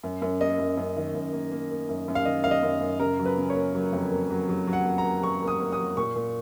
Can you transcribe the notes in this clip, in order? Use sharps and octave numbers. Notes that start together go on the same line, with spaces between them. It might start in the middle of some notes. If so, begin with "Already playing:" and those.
F#2
F#2
A#3 D#5
F#2
F#2
D#3
F#2
A#3
A#3
A#3
F#2
F#2
F5
D#3 D#5
F#2 F5
D#5
F#2
F#2
C#3 A#4
F#3
B4
C#3
C#5
A#3
F#3
F2
A#3
F#3
F#3
F#3
F#5
A#3
A#5
A#3
F#3 C#6
A#3
D#6
A#3
D#6
F#3
A#2 C#6
A#2